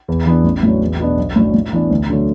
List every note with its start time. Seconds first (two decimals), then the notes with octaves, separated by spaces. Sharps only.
0.08 E2
0.26 E3 B3 D4
0.44 A1
0.63 A2 F#3 D4
0.81 E2
1.00 B2 B3 D4
1.17 B1
1.36 A2 F#3 D4
1.54 A2
1.73 E3 B3 D4
1.91 D2
2.09 D3 F#3 A3